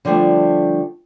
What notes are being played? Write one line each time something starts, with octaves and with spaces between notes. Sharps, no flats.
D3 F3 G3 A3 D4